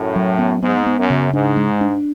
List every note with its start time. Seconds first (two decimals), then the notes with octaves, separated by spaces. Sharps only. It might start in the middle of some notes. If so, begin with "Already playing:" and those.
Already playing: F#2 A2
0.16 F#3
0.39 B3
0.63 G#2 B3
0.86 B3
0.98 F#2
1.10 C#3
1.33 G#2 D4
1.57 G#3
1.81 D4